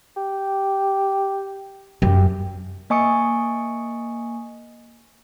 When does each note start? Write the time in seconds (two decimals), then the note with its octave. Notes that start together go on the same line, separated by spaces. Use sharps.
0.17 G4
2.02 F#2 G4
2.90 A#3 D#5 G#5 C#6 D#6 C#7